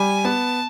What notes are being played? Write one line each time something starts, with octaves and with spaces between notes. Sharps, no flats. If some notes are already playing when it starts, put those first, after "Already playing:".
Already playing: G3 G#5
B3 A5